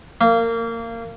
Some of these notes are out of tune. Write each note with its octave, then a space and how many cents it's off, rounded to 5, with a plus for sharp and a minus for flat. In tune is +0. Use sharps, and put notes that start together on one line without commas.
A#3 -25